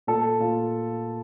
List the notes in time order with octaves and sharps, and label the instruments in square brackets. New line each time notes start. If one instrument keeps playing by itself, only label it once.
[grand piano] A#2 A4
A#2 F4